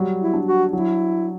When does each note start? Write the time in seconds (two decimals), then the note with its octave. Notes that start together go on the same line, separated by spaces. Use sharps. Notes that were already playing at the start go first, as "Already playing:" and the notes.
Already playing: F#3 G3
0.20 E4
0.34 D4
0.47 F#4
0.73 F#3 E4